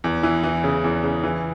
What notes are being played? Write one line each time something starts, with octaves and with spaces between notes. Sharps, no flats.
E2
E3
E3
C#3
E2
C#3
E3